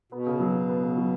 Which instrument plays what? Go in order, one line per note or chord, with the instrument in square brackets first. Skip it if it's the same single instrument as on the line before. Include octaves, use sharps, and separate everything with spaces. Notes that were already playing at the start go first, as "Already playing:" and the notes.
[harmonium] B2 [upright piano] B3
[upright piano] C#3
F#3
C#3
B3
C#3
F#3